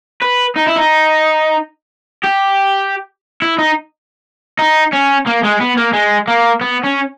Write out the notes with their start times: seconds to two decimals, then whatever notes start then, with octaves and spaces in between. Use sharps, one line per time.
0.22 B4
0.56 D#4
0.67 E4
0.76 D#4
2.24 G4
3.42 E4
3.58 D#4
4.59 D#4
4.93 C#4
5.26 A#3
5.43 G#3
5.60 B3
5.77 A#3
5.93 G#3
6.28 A#3
6.61 B3
6.84 C#4